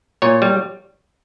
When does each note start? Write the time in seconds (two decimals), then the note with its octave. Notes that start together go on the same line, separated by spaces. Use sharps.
0.22 A#2 C#5
0.42 G3